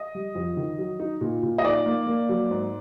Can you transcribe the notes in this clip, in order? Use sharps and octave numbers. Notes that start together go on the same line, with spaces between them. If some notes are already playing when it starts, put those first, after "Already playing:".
Already playing: D#5
G3
F2
D#3
F#3
D#4
A#2
A#2
D#5
D#4 D5
A#3
A#3
F#3
G#2